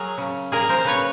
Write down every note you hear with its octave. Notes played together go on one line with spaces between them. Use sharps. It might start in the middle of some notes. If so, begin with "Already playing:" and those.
Already playing: F#3 G#4 A#4
C#3
A#3 G#4 A#4
A#4 C5
C#3 B4 C#5